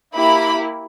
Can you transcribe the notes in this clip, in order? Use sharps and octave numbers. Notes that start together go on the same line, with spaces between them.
A#3 E4 G4 B5